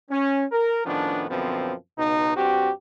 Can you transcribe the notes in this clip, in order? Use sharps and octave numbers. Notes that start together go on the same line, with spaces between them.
C#4
A#4
A2 D#3 F3 B3 C#4 D4
F#2 B2 D3 F3 B3 C4
C#2 B2 D#4
G2 C4 F#4 G4